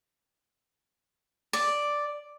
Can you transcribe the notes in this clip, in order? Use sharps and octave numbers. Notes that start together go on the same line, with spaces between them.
D5